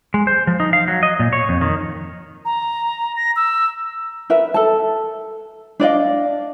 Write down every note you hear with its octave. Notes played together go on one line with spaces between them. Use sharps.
G#3
C5
F3
D#4
F5
F#3
D#5
A#2
C#5
F2
D#3
A#5
A#6
E6
A#4 B4 E5
A4 A5
D4 D5 D#5 F5